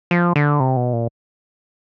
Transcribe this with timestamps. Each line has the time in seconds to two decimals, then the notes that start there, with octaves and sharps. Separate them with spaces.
0.11 F3
0.36 D3
0.60 C3
0.77 B2
0.93 A#2